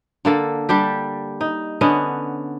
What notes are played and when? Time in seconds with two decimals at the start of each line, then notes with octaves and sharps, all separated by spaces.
0.25 D3 A#3 A4
0.69 G3 D4 G4
1.41 D#4
1.81 D3 B3 C#4 D#5